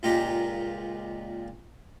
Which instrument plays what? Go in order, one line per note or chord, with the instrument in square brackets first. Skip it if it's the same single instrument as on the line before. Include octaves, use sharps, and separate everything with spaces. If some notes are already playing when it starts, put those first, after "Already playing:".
[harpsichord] C#2 A#2 G#3 F4 G4 A#5